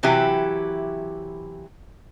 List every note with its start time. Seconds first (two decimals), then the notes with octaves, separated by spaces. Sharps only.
0.03 C3 E3 F#3 E4 G4